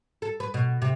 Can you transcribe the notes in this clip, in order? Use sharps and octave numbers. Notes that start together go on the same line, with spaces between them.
A4
B4
B2
C3